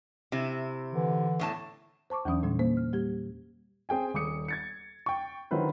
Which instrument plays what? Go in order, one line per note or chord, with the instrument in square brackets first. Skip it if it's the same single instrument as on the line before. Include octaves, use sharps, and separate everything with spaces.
[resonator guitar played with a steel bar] C3 E4
[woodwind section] D3 E3
[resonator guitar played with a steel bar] E2 A2 A5
[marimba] C5 A5 C#6 D6
E2 E3 F#3 C#4 D#6
A#2 D3 G3
A#3 C5
F6
G3 G4 G#6
[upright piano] C4 G#4 G5 G#5
D#1 D6 D#6 C#7
G#6 A6 C#7
G5 C#6
D3 D#3 F#3 E4 B4 C5